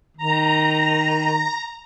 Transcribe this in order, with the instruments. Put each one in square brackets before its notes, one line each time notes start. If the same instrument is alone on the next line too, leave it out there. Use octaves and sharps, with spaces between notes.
[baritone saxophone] D#3 [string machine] A#5